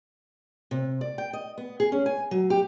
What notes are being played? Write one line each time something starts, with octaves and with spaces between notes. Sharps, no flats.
C3
D5
G5
D#5
B3
G#4
C#4
G#5
F#3
G4